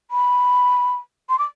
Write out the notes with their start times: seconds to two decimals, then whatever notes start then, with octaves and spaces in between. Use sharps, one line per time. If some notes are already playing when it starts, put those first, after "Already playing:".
0.11 B5
1.29 C6
1.39 D6